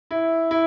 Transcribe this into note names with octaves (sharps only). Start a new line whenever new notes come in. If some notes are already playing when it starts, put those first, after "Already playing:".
E4
E4